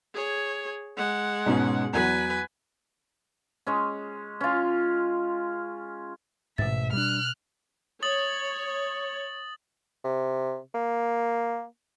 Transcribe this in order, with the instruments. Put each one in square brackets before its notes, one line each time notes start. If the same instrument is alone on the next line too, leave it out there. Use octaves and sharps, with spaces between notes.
[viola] G#4 C#5
G#3 F#5
[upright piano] G#2 B2 C#4
[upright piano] E2 F#3 [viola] B4 G#5
[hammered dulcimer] G#3 C#4
C#4 F4
[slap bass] A1 G#2 [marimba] B2 A6 [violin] E5
[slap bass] G3 A#3 D4 [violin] F6 F#6
[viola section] C#5 [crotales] D#6 A6 F#7
[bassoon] C3
A#3